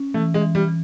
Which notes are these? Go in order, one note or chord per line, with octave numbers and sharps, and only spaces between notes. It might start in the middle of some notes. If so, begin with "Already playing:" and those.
Already playing: C#4
E3 A3
G#3
E3
G3
E3